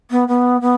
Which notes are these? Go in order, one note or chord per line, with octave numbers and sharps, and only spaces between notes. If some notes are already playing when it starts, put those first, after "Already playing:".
B3
B3
B3